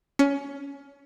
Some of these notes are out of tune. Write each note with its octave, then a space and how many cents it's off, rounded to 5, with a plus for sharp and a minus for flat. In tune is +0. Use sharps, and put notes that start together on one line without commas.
C#4 +20